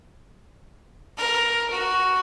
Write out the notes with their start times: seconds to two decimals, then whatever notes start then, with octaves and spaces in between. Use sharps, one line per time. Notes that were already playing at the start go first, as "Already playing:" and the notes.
1.17 A#4
1.70 F#4